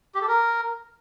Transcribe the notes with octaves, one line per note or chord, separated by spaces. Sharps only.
G4
A4
A#4